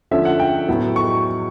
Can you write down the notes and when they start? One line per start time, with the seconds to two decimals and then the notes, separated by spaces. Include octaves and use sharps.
0.11 D3 F3 A3 C#4 E5
0.25 F#5
0.40 G5
0.68 A2 F#3 B3
0.96 C#6